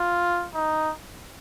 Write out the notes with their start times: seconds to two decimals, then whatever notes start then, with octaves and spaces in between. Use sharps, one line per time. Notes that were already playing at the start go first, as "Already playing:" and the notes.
Already playing: F4
0.54 D#4